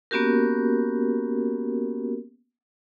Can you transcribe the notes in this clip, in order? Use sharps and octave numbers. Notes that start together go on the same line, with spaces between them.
A#3 B3 C#4 F#4 G4 A#4